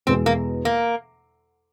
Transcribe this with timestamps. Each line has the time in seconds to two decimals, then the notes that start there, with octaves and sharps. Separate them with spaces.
0.07 E2 B2 G#3 B3 C4
0.26 A#3
0.65 A#3